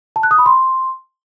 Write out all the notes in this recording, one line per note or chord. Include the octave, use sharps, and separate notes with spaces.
A5
F#6
D#6
B5
C6